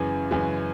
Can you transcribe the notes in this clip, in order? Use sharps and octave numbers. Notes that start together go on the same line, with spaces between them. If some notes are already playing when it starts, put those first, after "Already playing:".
Already playing: F#2 C#3 E3 G#3 C#4
F#2 C#3 E3 G#3 C#4